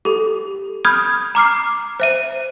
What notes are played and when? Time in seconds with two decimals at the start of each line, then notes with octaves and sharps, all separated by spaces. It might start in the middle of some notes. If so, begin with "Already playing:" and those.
0.05 G4 A4
0.85 B5 D#6 F6 G6 G#6
1.35 A#5 D6 F6 C7
2.00 C5 E5 D#7